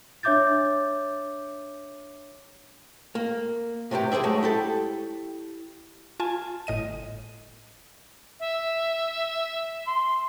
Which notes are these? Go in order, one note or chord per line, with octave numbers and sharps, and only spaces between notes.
D4 C#5 E5 D6 G6 A6
A#3
A2 C3 E3 G4
G#4 B4 C5 D5 E5
F#3 G#3 A3
E4 G4 A4
F4 G#5 A5
G1 A2 D#5 D#7
E5
C6